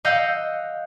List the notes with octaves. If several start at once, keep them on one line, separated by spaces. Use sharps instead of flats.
D#5 F5 F#5 E6 G6